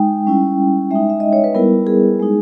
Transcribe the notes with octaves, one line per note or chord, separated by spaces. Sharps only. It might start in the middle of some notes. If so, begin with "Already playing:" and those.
Already playing: G#3 D#4 G5
G3 C#4 E4
G#3 D#4 E5
E5
D#5
C#5
B4
G3 B3 E4 A#4
G#4
G#3 D#4